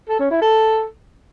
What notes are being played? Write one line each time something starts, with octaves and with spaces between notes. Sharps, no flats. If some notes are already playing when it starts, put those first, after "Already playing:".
A4
C#4
E4
A4